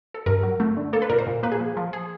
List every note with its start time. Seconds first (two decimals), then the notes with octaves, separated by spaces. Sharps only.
0.14 A4
0.26 G2 A#4
0.43 F#3
0.60 A3
0.77 D3
0.93 A#3 A4
1.02 B4
1.10 A#2 A#4
1.18 C5
1.27 A#2
1.43 A#3 B4
1.52 G#4
1.60 F3
1.77 F3
1.93 G#4